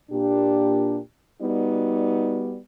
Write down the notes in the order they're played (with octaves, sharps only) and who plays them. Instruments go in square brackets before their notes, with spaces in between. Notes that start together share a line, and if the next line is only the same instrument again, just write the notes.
[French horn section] A#2 D4 G4
G3 B3 D#4 F#4 D5